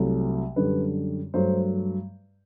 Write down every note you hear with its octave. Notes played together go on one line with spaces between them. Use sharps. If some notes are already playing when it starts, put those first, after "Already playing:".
Already playing: C2 C3 F#3 A3
F#2 D3 G3 B4
G2 F#3 A3 C5